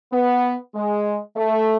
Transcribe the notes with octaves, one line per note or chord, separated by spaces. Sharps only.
B3
G#3
A3